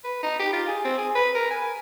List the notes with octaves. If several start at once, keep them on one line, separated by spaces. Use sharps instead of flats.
B4
D#4
G4
F4
G#4
C4
G#4
B4
A#4
G#5